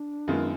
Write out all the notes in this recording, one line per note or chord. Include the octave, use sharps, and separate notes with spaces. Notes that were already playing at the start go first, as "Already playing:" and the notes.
Already playing: D4
F#2 D#3 G#3 B3 F4